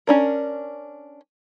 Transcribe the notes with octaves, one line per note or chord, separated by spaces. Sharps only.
C#4 D4 A#4